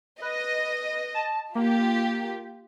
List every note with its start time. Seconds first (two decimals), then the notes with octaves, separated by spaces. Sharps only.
0.22 B4 D#5
1.14 A5
1.55 A#3 F4 G4